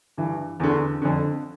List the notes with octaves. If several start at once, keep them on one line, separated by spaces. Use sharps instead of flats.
G2 E3
E2 D3
F2 D3